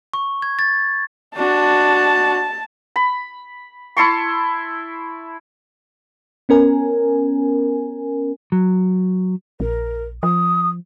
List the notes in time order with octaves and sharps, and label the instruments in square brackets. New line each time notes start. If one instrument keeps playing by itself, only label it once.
[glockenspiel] C#6
G#6
A6
[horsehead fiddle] D4 F#4 [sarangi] A5
[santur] B5
E4 A5 C6 C#6
[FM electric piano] B3 C#4 A#4 G#5
[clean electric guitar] F#3
[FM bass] A#1 [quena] A#4
[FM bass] F3 [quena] D#6